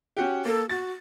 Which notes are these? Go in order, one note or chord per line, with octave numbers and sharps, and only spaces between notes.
C#4 F#4 G4
A#3 A4
F#4 A6